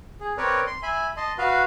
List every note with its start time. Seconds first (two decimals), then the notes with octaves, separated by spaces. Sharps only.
0.20 G#4
0.38 C4 A#4 B4 C#5 D5
0.67 C6
0.83 E5 G#5 B5
1.17 D#5 A5 C6
1.38 F#4 B4 F5